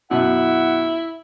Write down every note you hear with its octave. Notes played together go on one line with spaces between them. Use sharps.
F#2 B2 E4 F#5